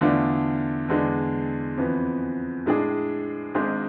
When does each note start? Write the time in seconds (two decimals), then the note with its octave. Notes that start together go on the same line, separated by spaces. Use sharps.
0.01 E2 D3 A3 D4 F4
0.88 E2 D3 G#3 D4
1.77 F2 E3 B3
2.66 A2 G#3 D4 G#4
3.55 G#1 G#2 G#3 D4 G#4